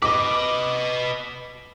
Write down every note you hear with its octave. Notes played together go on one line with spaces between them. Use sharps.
B4 D#5 D6